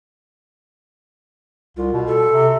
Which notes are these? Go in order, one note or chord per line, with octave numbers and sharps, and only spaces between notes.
C2 F4
B2
A4
C3